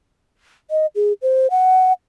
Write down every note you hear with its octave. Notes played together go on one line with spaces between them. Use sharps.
D#5
G#4
C5
F#5